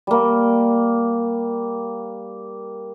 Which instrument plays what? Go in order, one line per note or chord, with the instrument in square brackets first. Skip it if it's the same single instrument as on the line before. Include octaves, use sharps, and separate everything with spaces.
[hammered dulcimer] G3 A#3